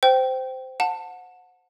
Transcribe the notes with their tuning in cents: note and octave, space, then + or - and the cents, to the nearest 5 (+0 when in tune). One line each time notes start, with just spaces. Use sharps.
C5 -10 G5 -10
F#5 -20 A5 +15